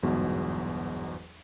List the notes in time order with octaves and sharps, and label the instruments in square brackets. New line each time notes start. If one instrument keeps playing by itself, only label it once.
[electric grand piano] G1 E2 G#2 B2 F#3